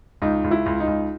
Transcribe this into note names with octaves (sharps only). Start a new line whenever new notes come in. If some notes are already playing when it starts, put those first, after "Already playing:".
C#2 D#4
C#2
E4
C#2
D#4
C#2